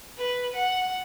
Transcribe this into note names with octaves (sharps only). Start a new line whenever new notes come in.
B4
F#5